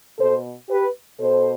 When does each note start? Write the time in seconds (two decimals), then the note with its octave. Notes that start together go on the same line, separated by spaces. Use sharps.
0.19 B2 A4 C5
0.69 G4 B4
1.20 B2 A4 C5